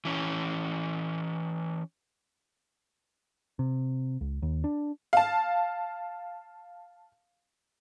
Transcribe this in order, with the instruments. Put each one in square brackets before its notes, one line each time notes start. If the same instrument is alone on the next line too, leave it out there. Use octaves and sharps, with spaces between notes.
[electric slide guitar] E3 C#4
[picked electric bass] C3
C#2
D#2
D4
[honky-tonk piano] F5 A5